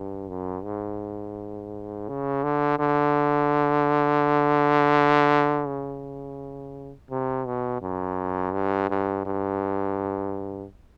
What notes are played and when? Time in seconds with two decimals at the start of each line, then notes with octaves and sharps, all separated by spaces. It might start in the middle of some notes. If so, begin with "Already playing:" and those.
Already playing: G2
0.29 F#2
0.64 G#2
2.09 C#3
2.43 D3
2.79 D3
5.67 C#3
7.10 C3
7.47 B2
7.82 F#2
8.53 G2
8.90 G2
9.25 G2